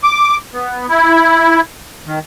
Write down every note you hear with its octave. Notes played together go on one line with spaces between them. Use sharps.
D6
B3
E4
D#3